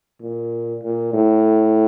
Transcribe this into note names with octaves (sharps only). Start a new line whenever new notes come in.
A#2
A#2
A2